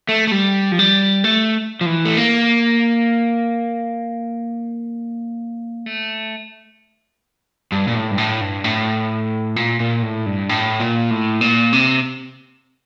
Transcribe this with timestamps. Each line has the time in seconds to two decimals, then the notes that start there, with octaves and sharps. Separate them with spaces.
0.09 A3
0.27 A3
0.32 G3
0.72 F3
0.79 G3
1.24 A3
1.81 F3
1.86 E3
2.05 A3
2.17 A#3
5.86 A3
7.72 G2
7.88 A#2
7.95 A2
8.11 G2
8.18 A2
8.41 G2
8.64 A2
9.56 A#2
9.80 A#2
10.02 A2
10.26 G2
10.49 A2
10.80 A#2
11.11 A2
11.41 A#2
11.73 C3